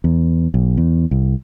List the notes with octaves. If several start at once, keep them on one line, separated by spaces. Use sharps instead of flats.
E2
B1
E2
C2